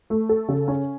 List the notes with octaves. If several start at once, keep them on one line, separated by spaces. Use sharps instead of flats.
A3
A4
C#3
C#4